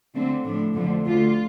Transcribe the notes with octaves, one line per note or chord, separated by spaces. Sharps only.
D2 D3 A3 C4
A2 F3 D4
F2 D3 F3 A3
D2 D3 A3 F4